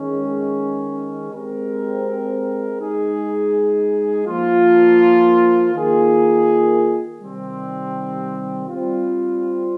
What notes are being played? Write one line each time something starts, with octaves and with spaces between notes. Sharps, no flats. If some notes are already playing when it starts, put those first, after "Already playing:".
Already playing: D#3 G#3 C#4
G#3 C4 G4 A#4
G#3 D#4 G#4
F3 A#3 F4
D#3 A#3 F4 G#4
C3 D#3 G3 C4
G3 C4 F4